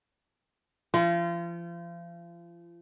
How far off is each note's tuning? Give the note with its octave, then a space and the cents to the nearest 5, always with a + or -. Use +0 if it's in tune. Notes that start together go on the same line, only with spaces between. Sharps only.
F3 -35 F4 -35